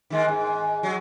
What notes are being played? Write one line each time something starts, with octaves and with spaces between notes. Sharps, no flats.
D#3 G#3 A#3
G#2
F#3 G#3